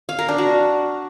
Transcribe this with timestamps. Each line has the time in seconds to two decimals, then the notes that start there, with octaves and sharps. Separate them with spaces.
0.09 F5
0.19 A#4
0.28 D4
0.38 F#4